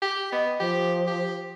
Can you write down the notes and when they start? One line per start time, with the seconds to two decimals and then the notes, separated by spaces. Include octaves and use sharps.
0.02 G4
0.32 B3 D#5
0.60 F3 G4
1.07 G4